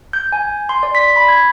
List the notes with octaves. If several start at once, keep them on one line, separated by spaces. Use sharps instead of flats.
G6
G#5
C6
D5
B6
B5
G#6